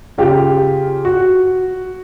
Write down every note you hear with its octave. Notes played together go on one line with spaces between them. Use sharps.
C#3 F4 G4
F#4